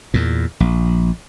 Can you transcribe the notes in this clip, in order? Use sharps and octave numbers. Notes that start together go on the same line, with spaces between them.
E2 A#2
A#1